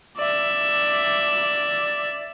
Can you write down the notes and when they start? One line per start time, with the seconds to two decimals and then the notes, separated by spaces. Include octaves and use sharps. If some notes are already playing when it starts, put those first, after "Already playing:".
0.18 D5 E5